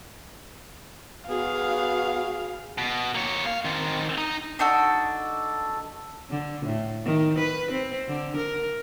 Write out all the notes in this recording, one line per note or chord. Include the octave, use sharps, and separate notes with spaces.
B3 F#4 G#4 F5
B2
A#3 C#5
F5
D#3 C4
D#4
D4 D#4 F#4 A4
D3
A2
D#3
B4
C4
D3
A#4